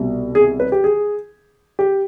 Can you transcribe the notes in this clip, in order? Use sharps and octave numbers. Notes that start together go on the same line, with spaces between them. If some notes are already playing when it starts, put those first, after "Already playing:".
Already playing: C2 B2 G3
G#4
B4
G4
G#4
G4